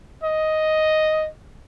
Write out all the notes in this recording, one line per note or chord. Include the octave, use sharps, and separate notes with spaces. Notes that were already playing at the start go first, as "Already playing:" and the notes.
D#5